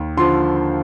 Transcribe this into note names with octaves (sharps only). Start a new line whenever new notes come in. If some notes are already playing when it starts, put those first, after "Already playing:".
Already playing: D#2
D3 F3 C6